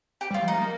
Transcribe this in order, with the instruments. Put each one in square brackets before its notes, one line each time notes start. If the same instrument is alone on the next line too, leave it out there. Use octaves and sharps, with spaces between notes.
[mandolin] G4
[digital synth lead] G3 [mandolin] F4
[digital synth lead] F3
[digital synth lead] A#3 [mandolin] D#4
[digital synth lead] A#3